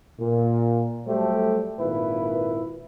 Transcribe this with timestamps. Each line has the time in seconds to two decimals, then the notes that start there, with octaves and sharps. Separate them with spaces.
0.20 A#2
1.07 F#3 G3 A3 G4 A4 C5
1.79 G#1 A#2 A#3 E4 B4